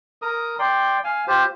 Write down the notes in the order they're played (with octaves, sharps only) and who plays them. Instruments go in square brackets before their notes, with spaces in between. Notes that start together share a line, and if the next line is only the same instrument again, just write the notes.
[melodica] A#4 D#6
D5 G5 C6
F5 G#5
F4 G4 C5